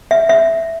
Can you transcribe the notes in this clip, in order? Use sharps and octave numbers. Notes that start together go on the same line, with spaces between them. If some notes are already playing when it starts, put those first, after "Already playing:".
E5
E5